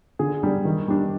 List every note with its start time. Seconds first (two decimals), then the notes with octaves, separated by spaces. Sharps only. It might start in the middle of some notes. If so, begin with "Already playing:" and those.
0.19 D3 G#4
0.43 G3 D4
0.65 D#3
0.88 G3 D4